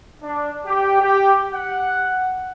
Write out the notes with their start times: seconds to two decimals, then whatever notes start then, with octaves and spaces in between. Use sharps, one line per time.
0.22 D4
0.65 G4
1.00 G4
1.51 F#5